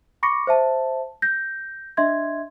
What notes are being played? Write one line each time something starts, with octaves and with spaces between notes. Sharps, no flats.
B5 C#6 D6 A#6 C#7
C5 E5 A5
G6 A#6
D4 D#5 E5 C6 G#6